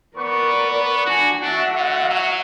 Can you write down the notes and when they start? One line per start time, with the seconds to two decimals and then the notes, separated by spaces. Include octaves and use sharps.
0.17 B3 A#4 B4 D5 C#6
1.06 D4 F#4 G#5
1.42 D4 F#4 E5 F#5
1.73 D3
2.10 F#3